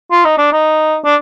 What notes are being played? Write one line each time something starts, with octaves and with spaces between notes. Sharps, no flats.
F4
D#4
D4
D#4
D4